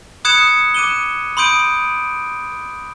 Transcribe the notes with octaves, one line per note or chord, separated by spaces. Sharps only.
B5 D#6 F#6 G#6 C#7 E7
D6 F#6 D#7 E7 G7
B5 C6 D#6 G6 D7 D#7